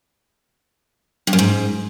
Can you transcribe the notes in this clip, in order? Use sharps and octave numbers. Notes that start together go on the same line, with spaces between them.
G2
F#2
G#2